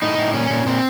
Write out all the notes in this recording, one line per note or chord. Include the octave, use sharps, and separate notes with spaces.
A2 D#4
A2
A#2 C#4
A#2
A#2 C4